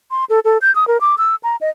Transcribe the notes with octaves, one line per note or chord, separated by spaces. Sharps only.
C6
A4
A4
G6
D#6
A#4
D6
E6
A#5
D#5